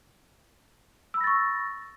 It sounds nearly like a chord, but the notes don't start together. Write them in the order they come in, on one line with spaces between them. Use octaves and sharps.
E6 B5 A#6 A6 C#6